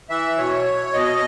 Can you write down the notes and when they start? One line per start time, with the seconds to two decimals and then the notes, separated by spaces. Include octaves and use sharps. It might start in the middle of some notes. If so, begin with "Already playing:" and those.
0.10 E3 E5
0.38 B2 C#5
0.93 B2 D#5